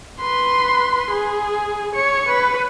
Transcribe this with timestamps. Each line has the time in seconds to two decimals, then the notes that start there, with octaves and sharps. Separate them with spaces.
0.21 B4 C6
1.12 G#4
1.95 C#5 C#7
2.29 B4